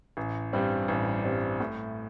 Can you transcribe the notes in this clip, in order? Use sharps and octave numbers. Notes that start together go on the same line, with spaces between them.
A1
G2 G3 C4
A1
G2 G3 C4
A2